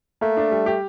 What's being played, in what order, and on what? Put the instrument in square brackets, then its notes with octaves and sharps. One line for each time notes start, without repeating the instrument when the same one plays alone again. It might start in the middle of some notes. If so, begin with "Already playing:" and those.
[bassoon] A3 [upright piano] A#3
[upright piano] D4
G3
G4